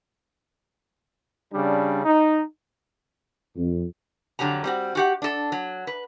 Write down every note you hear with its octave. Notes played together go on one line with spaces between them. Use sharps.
C#3 G3 D4
D#4
F2
F2 D3 F#3 G4 A#5
G3 C4 F#4
F#4 G4 F#5
D4 A4
F#3
B4